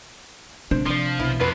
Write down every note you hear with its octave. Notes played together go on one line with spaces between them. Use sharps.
C3 D4 C5
F3 D5 C6
B1 B2 E4
F2 C3 F#3 F4 B4